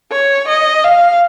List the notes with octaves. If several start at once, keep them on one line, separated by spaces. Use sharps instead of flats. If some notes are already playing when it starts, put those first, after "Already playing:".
C#5
D#5
F5